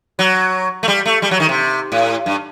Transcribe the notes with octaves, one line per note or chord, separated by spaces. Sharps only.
F#3
A3
G3
A3
G3
F#3
D#3
C3
A2
G2